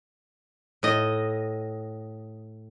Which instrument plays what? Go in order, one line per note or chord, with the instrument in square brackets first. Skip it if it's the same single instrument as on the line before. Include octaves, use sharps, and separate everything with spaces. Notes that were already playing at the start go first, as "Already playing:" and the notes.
[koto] A2 D#5